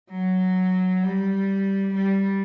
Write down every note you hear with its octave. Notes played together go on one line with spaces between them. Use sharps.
F#3
G3
G3